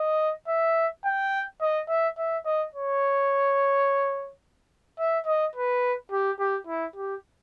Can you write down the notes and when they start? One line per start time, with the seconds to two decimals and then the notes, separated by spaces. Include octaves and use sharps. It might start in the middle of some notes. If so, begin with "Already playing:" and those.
Already playing: D#5
0.48 E5
1.05 G5
1.61 D#5
1.88 E5
2.18 E5
2.46 D#5
2.74 C#5
4.99 E5
5.26 D#5
5.55 B4
6.12 G4
6.39 G4
6.67 E4
6.96 G4